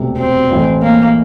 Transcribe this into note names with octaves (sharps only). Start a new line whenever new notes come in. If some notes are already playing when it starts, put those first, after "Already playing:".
Already playing: E1 D2 C3
C4
A1 A2 E3 A3
A#3